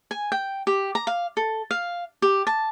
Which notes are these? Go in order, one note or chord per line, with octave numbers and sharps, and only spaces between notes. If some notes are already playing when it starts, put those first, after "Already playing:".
G#5
G5
G4
A#5
F5
A4
F5
G4
A5